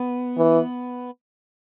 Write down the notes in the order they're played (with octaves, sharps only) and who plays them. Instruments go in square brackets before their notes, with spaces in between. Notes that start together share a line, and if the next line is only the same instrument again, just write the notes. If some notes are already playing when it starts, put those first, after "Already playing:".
Already playing: [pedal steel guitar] B3
[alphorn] E3